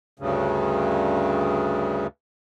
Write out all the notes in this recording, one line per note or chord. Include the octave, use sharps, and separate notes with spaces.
D2 G2 C#3